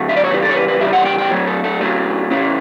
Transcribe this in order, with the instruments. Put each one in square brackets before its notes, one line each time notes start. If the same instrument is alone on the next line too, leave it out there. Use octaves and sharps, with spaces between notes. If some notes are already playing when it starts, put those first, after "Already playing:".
Already playing: [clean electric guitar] D3 F#3 A3
E5
D5
C#5
C#3 E3 G3 B4
A4
C#5
B4
B4
C#3 E3 G3 E5
F#5
G5
G5
A2 F#3 A3 C#5
A4
A4
A2 F#3 A3 C#4
C#3 E3 A3 C#4